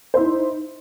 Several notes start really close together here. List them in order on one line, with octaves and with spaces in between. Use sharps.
C5 E4 D#4